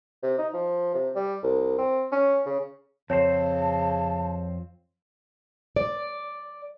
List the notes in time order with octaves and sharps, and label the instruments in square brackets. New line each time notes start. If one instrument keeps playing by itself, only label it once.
[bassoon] C3
D#4
F3
C3
G3
C2
C4
C#4
C#3
[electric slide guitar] F2 C4 C5 [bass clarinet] C#3 [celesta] C#5 [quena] A5
[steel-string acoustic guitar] D5